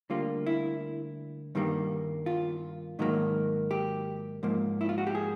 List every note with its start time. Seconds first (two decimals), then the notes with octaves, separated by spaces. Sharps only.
0.10 D2 D3 G3 A#3 F4
0.46 E4
1.55 G2 D#3 G3 A#3
2.26 F4
2.99 G#2 D#3 F#3 A#3
3.71 G4
4.43 G#2 F3 A#3
4.81 E4
4.89 F4
4.98 F#4
5.07 G4
5.15 G#4